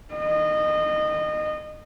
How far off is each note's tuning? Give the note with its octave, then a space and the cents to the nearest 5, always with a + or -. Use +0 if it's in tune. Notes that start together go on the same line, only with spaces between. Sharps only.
D#5 -25